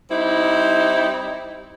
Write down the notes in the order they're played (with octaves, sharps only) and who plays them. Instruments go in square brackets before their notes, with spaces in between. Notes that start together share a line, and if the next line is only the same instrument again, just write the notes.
[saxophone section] G3 C4 D#4 E4